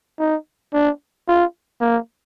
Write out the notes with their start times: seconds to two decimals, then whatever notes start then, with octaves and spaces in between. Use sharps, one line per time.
0.19 D#4
0.73 D4
1.28 F4
1.81 A#3